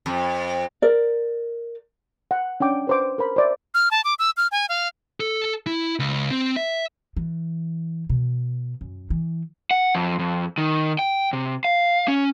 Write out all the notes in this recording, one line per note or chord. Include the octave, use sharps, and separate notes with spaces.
F2
A#4 D5
F#5
C#4 D4 G5 D6
B4 C5 D6
A#4 C5 B5
C5 D5 E5
F6
A5
D6
E6
F6
G#5
F5
A4
E4
C#2
C4
E5
E3
B2
F#2
E3
F#5
F2
F2
D#3
G5
C3
F5
C#4